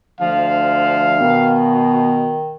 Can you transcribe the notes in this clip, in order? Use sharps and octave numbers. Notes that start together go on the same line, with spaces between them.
D2 F3 F5
B2 D#3